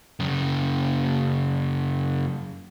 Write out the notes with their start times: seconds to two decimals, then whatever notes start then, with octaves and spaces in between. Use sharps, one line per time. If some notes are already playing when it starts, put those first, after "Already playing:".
0.20 F#2 C#3